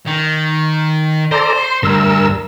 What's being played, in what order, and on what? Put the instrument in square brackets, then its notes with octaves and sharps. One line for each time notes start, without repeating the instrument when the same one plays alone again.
[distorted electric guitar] D#3
[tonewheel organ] A4 D5 A#5 [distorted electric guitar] C5
[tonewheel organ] C6
[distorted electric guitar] D2 [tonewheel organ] G2 A#4 E6